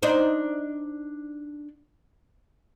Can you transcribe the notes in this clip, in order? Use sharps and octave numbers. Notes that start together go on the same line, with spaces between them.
D4 D#4 C5